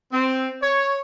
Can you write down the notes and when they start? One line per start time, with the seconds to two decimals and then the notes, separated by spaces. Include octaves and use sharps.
0.13 C4
0.62 C#5